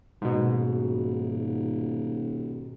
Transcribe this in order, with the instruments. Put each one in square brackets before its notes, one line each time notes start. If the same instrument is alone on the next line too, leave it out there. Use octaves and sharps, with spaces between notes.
[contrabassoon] D#1 [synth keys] G#2 B2